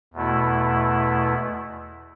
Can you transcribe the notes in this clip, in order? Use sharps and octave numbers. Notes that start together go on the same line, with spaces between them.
E2 B2 A3 E4